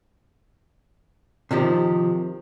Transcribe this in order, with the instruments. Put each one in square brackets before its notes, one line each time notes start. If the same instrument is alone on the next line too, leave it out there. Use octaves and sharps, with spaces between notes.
[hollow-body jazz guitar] C3 D#3 F3 G4